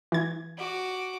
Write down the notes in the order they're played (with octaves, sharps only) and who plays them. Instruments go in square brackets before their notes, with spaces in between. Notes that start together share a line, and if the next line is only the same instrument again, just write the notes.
[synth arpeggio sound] E3 G#6
[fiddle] F#4 D6